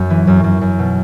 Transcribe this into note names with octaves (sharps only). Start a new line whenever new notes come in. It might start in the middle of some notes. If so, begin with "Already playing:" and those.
Already playing: F#2
E3
F#2
F#2
F#2
B2